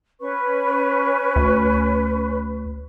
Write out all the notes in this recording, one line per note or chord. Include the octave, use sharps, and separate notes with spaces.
C#4 B4 C#6
D2